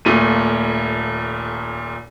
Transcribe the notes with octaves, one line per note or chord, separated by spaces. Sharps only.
D#1 A#2 A3 D#7